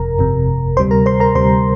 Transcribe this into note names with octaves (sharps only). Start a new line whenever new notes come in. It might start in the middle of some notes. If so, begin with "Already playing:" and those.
Already playing: G1 F2 C3 A#4 A#5
G1 F2 C3
D2 C3 G3 C5 C6
A#4 A#5
C5 C6
A#4 A#5
D2 C3 G3 C5 C6